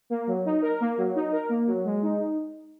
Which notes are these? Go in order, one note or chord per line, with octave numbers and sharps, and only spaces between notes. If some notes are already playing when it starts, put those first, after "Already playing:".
A#3
F#3
D#4
A#4
A#3
F#3
D#4
A#4
A#3
F#3
G#3
D#4